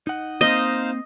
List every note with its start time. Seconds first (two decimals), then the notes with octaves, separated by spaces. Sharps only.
0.07 D#4 D#5 F#5
0.41 A#3 C4 D#4 C5 D#5 F5